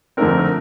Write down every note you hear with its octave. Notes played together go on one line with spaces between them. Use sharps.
F2 D3 A3 C4 A#4
A#4
A#4